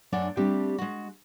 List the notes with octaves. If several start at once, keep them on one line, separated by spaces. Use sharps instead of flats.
F#2 A3 D4 D5 F#5 G#5
G3 A3 C4 D4 G4
G#3 F#4